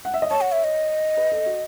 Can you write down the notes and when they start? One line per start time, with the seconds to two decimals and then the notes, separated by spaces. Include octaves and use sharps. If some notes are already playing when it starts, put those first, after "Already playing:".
0.05 F#5
0.14 E5
0.22 D#5
0.30 C#5 A5
0.41 F#5
0.52 E5
0.64 D#5
1.17 B4
1.32 A4
1.46 F#4